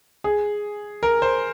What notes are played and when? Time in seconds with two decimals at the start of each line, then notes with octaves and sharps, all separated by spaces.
0.24 G#4
1.03 A#4
1.22 C5